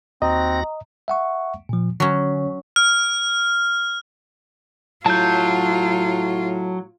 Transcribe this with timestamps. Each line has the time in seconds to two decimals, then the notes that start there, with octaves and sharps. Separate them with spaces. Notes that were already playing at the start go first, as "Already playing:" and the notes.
0.22 D#2 C4 F#4 D#5 A#5 A#6
1.08 E5 F#5 C#6
1.69 A#2 F3
2.00 D3 F#3 C#4
2.76 F6
5.06 A2 F#3 F4 A5 G6